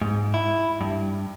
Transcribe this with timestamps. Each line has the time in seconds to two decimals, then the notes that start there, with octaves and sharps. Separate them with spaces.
0.02 G#2
0.34 E4
0.81 G2